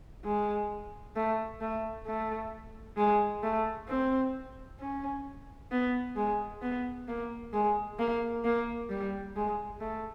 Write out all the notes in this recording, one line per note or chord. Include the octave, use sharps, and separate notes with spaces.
G#3
A3
A3
A3
G#3
A3
C4
C#4
B3
G#3
B3
A#3
G#3
A#3
A#3
G3
G#3
A3